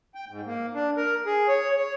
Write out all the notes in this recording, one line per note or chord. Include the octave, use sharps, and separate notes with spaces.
G5
G#2
A#3
D4
A#4
G#4
C#5
C#5